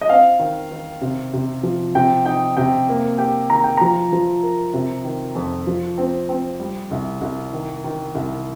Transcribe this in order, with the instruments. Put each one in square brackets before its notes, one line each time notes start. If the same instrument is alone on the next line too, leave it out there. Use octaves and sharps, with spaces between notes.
[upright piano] D#5
[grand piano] C4 [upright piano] F5
[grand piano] D#3
D#3
C3
C3
F3
[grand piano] C3 [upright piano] G5
[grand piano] D#4 [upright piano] G5
[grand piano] C3 [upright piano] G5
[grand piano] A#3
[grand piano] G4 [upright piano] G5
[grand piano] D#3 [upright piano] A#5
[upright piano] G5
[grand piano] F3 [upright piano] A#5
[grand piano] F3
A#4
C3
D#3
F2
F3
C4
C4
G3
C2
C2
D#3
D#3
C2